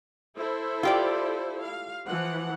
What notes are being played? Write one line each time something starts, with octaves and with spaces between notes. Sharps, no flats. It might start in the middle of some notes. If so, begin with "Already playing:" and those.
E4 A4 C5
F4 G4 D5
F5
E3 F3 F#5